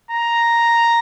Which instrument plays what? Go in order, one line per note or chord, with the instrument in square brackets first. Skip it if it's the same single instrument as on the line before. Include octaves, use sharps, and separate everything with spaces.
[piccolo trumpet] A#5